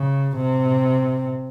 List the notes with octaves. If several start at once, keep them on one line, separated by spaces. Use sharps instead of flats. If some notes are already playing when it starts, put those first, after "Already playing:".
Already playing: C#3
C3